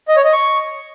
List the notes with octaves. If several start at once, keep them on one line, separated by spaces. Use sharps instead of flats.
D#5
C#5
D#5
C#6